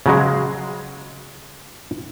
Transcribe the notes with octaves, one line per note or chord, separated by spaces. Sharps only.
C#3 F#3 G#3